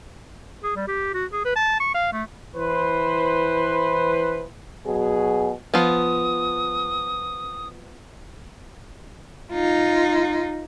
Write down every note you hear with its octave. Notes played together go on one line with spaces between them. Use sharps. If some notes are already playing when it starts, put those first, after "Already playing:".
G#4
G3
G4
F#4
G#4
B4
A5
C#6
F5
A3
E3 B4 C5
B2 F#3 G#4
F3 B3 D#6
D#4 F4